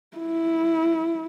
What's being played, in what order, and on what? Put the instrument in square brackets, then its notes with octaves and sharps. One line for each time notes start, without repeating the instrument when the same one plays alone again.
[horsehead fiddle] E4